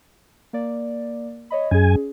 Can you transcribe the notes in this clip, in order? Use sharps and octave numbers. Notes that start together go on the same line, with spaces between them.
A#3 D5
C#5 D#5 B5
F#2 C#4 G#4 G#5